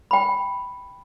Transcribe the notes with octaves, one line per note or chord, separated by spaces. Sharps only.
G5 B5